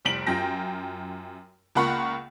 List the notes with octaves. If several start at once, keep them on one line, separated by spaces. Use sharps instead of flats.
F1 C2 B6 D7 F#7
F#2 F4 G5 A#6
C#2 A#3 F4 F#5 B5 C#6